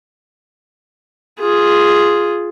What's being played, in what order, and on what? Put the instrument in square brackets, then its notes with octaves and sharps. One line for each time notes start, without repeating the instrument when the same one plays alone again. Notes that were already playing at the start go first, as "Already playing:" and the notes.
[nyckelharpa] F4 G#4